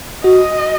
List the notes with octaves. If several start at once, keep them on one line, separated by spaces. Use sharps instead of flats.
F#4 D#5